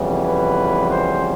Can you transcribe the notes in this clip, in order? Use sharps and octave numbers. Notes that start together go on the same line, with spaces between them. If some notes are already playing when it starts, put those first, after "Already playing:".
Already playing: F2 C#3 E3 G3 B3
B4
C5